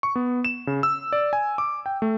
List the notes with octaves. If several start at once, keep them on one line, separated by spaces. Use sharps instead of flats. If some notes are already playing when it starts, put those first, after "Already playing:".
C#6
B3
E7
C#3
E6
D5
G#5
D6
G5
A3